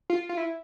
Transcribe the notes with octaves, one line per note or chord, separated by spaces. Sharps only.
F4
F4
E4